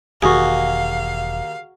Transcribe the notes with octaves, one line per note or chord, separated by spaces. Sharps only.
E1 D#2 F#4 G#4 F5